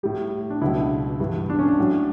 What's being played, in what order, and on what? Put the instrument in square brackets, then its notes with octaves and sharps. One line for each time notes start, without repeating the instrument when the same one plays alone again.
[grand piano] A2 G3 G4
D4
C#2 B2 F#3 E4
D4
G2 E3 G3
D4
C#4
D4
A2 F#3